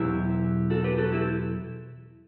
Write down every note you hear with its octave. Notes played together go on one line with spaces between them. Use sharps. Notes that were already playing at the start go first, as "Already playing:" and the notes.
Already playing: E2 B2 F#3 E4 G4
F#4 A4
G4 B4
F#4 A4
E4 G4